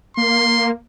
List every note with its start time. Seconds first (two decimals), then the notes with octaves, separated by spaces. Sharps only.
0.17 A#3 C6